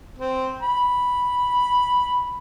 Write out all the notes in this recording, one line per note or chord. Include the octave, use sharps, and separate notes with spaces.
C4
B5